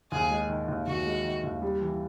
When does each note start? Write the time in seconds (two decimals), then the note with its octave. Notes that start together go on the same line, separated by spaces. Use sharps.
0.12 D#2 G#4
0.30 G#3
0.50 D#3
0.68 D#2
0.87 D#2 F#4
1.06 G#3
1.25 D#3
1.43 D#2
1.62 G3
1.82 E3